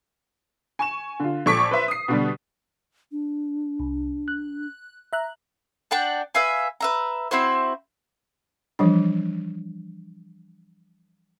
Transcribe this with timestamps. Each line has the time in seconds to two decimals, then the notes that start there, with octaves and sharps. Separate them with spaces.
0.79 G#5 C#6 E7
1.20 D3 F4
1.46 A#1 A4 C#6 D6 B6
1.71 B4 C5 E5
1.88 D#6 C7
2.08 B2 D3 G3
3.12 D4
3.80 C2
4.28 F#6
5.13 E5 A#5 F#6
5.91 D4 F#5 G5 A5
6.34 B4 E5 F5 G#5
6.81 B4 E5 A#5
7.31 C4 E4 F#4 C5
8.79 E3 F3 G3 D4